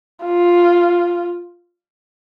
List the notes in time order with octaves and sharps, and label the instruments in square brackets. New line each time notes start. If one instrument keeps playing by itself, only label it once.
[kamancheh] F4